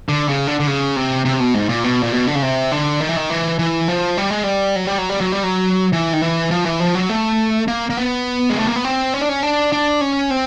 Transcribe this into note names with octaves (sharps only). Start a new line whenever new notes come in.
D3
C#3
D3
D3
C#3
C3
C3
B2
G#2
A#2
B2
A#2
B2
D3
C#3
C3
D3
D#3
E3
D#3
E3
E3
F3
G3
G#3
G3
F#3
G3
F#3
G3
F#3
G3
F#3
E3
D#3
E3
F3
E3
F3
F#3
A3
A#3
A#3
B3
G#3
A3
A#3
B3
C4
C#4
D4
C#4
D4
D4
C#4
C4